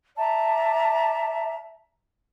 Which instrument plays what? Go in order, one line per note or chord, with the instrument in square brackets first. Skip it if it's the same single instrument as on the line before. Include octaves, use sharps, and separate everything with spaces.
[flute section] D5 E5 A5 A#5